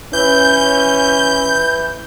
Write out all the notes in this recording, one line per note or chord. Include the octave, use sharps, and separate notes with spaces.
E3 C#4 G6